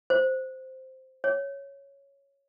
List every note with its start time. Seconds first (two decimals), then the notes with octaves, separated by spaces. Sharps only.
0.10 C5
1.24 C#5